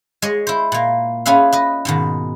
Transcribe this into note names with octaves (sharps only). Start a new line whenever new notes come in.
G#3 C#5 D#5
E4 C5
A#2 A#3
C#4 F4 G#4 B4 E5 F5
B4 D#5
G#2 B2 D#3